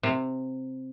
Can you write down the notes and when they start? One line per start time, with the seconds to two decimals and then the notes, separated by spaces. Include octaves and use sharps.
0.03 C3